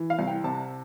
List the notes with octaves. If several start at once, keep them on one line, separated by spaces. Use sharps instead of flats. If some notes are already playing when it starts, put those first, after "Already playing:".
Already playing: E3
F5
C2
G5
C3 A5